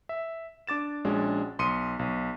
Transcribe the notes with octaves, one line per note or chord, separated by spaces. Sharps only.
E5
D4 D6 A6 E7
A#1 G#3 C#4 D4 F#4
B1 C6 D#6 C#7 D#7
B1